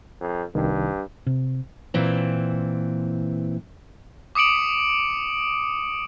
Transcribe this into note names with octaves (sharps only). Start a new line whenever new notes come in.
F2
C2 G2 D#3
C3
A#2 E3 C4
D6 D#6 C#7 D7 F#7